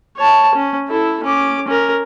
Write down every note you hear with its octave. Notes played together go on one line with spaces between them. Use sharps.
C#5 A5
C#4
E4 A4
C#4 D6
C#4 A#4